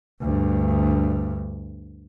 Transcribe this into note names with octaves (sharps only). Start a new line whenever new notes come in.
D2 G2